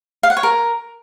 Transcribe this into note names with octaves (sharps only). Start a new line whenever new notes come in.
F5
F#5
C#5
A#4